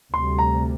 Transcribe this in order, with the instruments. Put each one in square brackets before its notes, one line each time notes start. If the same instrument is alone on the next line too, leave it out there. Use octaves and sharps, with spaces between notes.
[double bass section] D2 C3 G3 [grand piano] C6
[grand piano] A#5